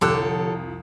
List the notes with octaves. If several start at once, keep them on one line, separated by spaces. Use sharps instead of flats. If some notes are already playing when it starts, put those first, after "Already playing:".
C2 F2 D3 G4 A4 C#5